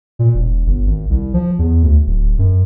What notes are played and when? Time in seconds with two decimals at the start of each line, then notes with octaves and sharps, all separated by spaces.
0.19 A#2
0.34 E1
0.66 G1
0.86 G#1
1.10 C2
1.34 F3
1.59 E2
1.83 D2
2.06 D1
2.38 F#2